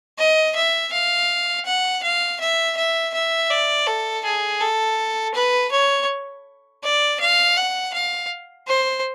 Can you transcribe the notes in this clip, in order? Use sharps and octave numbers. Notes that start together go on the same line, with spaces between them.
D#5
E5
F5
F#5
F5
E5
E5
E5
D5
A4
G#4
A4
B4
C#5
D5
F5
F#5
F5
C5